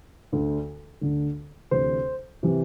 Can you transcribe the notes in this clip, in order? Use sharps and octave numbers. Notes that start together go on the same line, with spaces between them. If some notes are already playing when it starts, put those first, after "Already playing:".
D2 D3
D2 D3
D2 C3 E3 C5
C3 E3